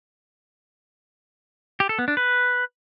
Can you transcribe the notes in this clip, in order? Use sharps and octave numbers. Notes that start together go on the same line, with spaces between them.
G4
A4
B3
D4
B4